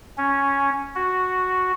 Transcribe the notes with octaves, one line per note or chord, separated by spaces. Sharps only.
C#4
F#4